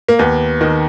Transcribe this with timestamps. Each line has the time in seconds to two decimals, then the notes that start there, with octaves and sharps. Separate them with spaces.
0.09 A#3
0.19 D#2 B3
0.61 D#3